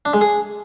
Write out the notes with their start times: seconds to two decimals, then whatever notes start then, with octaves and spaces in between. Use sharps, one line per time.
0.05 D4
0.13 G#3
0.21 G#4